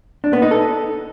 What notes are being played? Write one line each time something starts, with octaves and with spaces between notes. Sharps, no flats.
D4
B3
D#4
A4